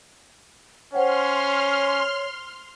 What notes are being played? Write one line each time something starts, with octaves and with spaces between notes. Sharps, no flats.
C#4 C5 C#5 F#5 G5 C6 F6